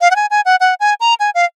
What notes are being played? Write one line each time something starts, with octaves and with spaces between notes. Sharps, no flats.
F5
F#5
G#5
G#5
F#5
F#5
G#5
A#5
G#5
F5